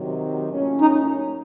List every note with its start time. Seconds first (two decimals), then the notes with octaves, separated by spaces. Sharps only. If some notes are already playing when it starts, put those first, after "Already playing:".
Already playing: C3 D#3 F#3
0.48 A2 F#3 A#3 C#4 F4
0.81 D#4